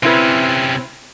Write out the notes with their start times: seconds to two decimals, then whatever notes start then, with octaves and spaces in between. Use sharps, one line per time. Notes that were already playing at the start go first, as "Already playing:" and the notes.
0.03 C3 C4 C#4 E4 B4